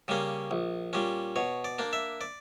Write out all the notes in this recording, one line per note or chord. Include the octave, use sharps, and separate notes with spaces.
C#3 G3 A#3 C#4
A#1
A#2 G3 C#4
B2 C#5
D5
A#3 D4
E5
D5